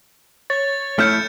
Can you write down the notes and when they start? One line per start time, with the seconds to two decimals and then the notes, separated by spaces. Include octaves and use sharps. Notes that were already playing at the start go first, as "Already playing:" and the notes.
0.50 C#5 A6
0.99 A3 E4 F6 G6 C#7